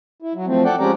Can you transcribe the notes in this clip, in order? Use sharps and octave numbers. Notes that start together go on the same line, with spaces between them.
E4
F#3
F3 A3 C4
A4 D5 F#5 G5
F3 G#3 C#4 G4 D5 A#5